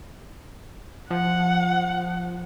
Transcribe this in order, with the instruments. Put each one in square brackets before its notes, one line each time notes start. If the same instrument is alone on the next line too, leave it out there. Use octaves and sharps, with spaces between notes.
[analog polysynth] F3 [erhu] F#5